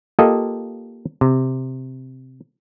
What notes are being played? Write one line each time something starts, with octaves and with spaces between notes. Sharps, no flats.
A#3 F4 G4 A4 D#5
C3